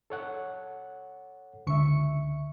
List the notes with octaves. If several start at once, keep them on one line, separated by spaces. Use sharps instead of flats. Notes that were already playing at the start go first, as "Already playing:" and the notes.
A4 C#5 F#5
C#2 D3 E5 C#6 C#7